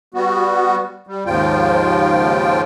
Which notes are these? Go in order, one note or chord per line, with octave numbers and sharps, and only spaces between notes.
G3 B3 F#4
G3
D#2 G#2 C#3 F3 F4 G5